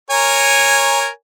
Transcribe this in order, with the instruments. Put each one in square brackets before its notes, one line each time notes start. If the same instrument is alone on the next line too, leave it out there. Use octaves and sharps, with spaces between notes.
[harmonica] A#4 C#5 G#5